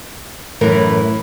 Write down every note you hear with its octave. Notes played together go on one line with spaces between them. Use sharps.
F#2 A2 E3 A3 A#4